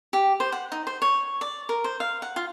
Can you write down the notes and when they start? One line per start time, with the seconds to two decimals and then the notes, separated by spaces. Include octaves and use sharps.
0.13 G4
0.40 C5
0.52 F#5
0.72 D#4
0.87 C5
1.02 C#5
1.41 D5
1.69 A#4
1.84 C5
2.00 F5
2.22 F#5
2.36 F4